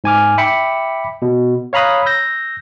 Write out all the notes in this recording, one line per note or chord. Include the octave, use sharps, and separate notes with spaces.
G#2 G#5 D6 F6
E5 G5 B5 D6 B6 C#7
B2
C#5 F5 A#5 B5 D#6 F#6
E6 G6 A#6